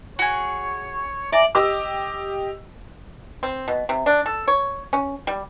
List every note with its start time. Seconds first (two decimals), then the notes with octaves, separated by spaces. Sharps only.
0.19 F#4 G#4 C#5
1.33 D5 E5 G#5 A#5 D6
1.55 G4 D#5 D6 E6
3.43 C4
3.68 B2
3.89 C3
4.06 D4
4.26 A4
4.48 C#5
4.93 C#4
5.27 G3